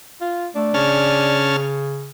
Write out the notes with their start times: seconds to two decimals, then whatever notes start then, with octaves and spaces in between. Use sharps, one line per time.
0.21 F4
0.55 A3 D4
0.74 C#3 C#4 A5 F6